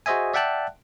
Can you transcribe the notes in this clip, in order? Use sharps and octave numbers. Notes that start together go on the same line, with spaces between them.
F#4 G#4 C5 D#5 E5 G#5
D5 E5 F#5 G5 A5 F#6